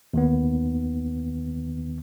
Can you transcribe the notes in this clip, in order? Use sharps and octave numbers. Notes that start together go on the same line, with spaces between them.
D#2 D#3 B3